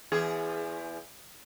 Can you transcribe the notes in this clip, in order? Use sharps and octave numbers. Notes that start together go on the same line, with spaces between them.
E2 G#4